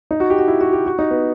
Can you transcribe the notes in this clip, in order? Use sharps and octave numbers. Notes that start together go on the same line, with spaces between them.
D#4
F#4
G4
F#4
E4
F#4
G4
F#4
D#4
B3